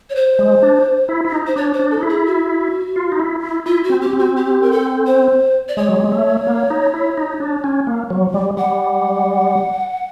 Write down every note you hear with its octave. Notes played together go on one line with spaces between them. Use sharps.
C#5
C5
G#3
D4
E4
E4
D#4
C5
D4 C#5
C5
D4
A4
D#4
E4
G#4
F#4
F4
D#4
E4
E4
E4 F4
F#4
C4
G4
C4
F#4
G4
A#4
A4
C5
D5
G#3 C#5
F#3
G3
G#3
A3
A#3
D#4
E4
D#4
D4
C#4
A#3
F#3
G3
G3 F#5